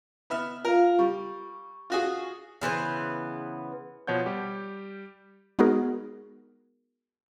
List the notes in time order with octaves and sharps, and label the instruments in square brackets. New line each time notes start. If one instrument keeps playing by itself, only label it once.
[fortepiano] B3 E5 F6
[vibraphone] F4 F5 [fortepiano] A#4
[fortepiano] G3 [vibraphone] C#6
[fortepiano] F4 F#4 G#4
[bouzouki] C#3 E3 B3 C5
[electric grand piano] B2 F3 C#5 F#5 G6
G3 G4
[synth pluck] G#3 B3 D#4 F#4 G#4 A#4